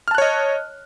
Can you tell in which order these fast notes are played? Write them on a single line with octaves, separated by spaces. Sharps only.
F6 A5 F#6 C#5 D#5